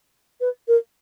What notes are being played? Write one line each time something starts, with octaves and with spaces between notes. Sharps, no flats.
B4
A#4